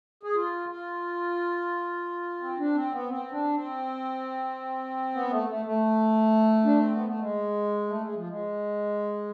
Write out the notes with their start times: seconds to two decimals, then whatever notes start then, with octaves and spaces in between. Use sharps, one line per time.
0.23 G#4
0.35 F4
0.69 F4
2.40 C4
2.58 D4
2.75 C4
2.92 B3
3.09 C4
3.31 D4
3.55 C4
5.14 B3
5.31 A3
5.49 A3
5.65 A3
6.65 D4
6.79 C4
6.92 B3
7.06 A3
7.20 G#3
7.89 A3
8.01 G#3
8.15 F3
8.28 G#3